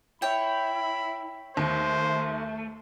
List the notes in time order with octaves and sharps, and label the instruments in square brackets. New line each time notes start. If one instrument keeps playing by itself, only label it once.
[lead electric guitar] E4 [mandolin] C#5 G5 [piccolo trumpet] B5
[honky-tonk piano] D#2 [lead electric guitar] A3 [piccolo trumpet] C5